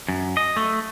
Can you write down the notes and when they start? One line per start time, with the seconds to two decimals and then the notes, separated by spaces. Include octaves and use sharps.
0.08 F#2
0.37 D#5
0.57 A3